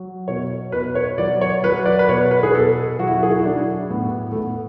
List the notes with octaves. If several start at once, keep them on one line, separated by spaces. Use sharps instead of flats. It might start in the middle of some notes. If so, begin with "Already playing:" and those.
Already playing: F#3
B2 C#5
B2 B4
C#5
F#3 D5
C#5
F#3 B4
D5
B4
B2 C#5
B4
G#4
B2 A4
F#3 F#4
E4
F#4
G#4
F#4
E4
F#3 D4
A2 B3
A3
A2 B3